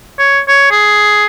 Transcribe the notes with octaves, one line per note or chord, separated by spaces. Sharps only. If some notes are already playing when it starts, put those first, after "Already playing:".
C#5
C#5
G#4